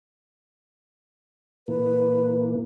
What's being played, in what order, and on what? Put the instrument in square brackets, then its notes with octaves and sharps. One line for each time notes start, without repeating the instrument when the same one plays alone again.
[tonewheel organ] A#2 E3 A#3 [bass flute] B4